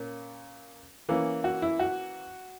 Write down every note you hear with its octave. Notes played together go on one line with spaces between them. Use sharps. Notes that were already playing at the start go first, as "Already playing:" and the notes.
Already playing: A#2 A#3 C#4
E3 A#3 C#4
F#4
E4
F#4